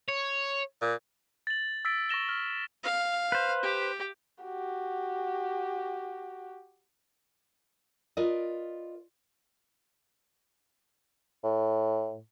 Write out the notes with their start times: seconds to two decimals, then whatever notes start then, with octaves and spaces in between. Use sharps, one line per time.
0.09 C#5
0.82 A#2
1.47 A6 F#7
1.85 E6 A6 B6 D7
2.09 C#6 E6 A#6 E7 G7
2.29 F6
2.83 F5
3.32 B4 C5
3.63 G4
4.44 F#4 G4
8.17 F4 A#4 B4 D5 D#5
11.44 A2